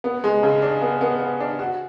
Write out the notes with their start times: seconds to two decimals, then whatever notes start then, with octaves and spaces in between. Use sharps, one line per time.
0.04 B3
0.24 G#3
0.43 C#3
0.62 D4
0.82 B3
1.01 B3
1.20 B3
1.40 D4
1.59 F#4